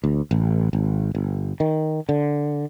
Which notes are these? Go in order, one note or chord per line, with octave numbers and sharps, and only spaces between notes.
D2
A1
G#1
G1
D#3
D3